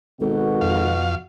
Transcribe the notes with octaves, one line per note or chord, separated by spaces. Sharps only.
G#1 B2 F#4 A4
F2 F5